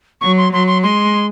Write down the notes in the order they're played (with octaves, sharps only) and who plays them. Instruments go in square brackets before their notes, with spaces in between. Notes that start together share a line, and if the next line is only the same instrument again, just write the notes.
[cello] F#3 [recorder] C#6
[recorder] C6
[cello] F#3 [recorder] C6
[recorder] C6
[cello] G#3 [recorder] C6